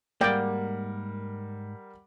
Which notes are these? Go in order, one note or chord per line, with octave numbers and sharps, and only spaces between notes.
G#2 G3 A#3 A#4 D5 F#5 G5